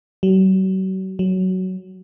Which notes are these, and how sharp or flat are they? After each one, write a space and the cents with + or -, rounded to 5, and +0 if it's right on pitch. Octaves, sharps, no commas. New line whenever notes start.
F#3 +40
F#3 +10